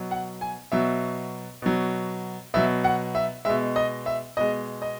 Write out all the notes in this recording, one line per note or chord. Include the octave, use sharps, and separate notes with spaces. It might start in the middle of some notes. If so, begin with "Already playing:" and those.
Already playing: B2 F#3
F#5
G#5
B2 F#3 E5
B2 F#3
B2 F#3 E5
F#5
E5
B2 G#3 E5
D#5
E5
B2 G#3 D#5
D#5